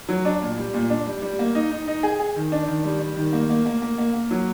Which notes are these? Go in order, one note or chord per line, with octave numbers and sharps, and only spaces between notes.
F#3
D4
A#2
G3
A#2
D4
G3
G3
A#3
D#4
D#4
D#4
G#4
G#4
D#3
D4
D#3
G3
G3
D#3
A#3
A#3
A#3
A#3
A#3
A#3
F#3